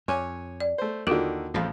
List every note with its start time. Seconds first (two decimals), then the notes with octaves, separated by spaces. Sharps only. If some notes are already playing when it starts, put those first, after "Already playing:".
0.08 F2 C#5 G#5 D6
0.60 D5
0.78 A3 C5
1.07 D#2 D3 D#3 F4 F#4 A#4
1.54 A1 F2 A2 F3